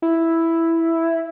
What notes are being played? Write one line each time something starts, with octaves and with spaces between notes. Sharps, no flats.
E4